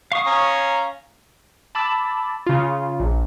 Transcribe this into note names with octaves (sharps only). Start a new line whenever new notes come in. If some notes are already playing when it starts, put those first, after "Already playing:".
F5 C#6 D#6
C#4 A#5
A5 B5 D6 E6 A6
C#3 F4
A#1